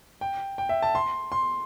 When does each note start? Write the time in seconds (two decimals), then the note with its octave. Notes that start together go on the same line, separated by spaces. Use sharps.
0.21 G5
0.58 G5
0.69 E5
0.82 A5
0.95 C6
1.32 C6